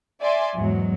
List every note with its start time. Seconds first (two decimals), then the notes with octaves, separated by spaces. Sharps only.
0.22 D5 E5 G#5 C6
0.57 E2 G#2 F#3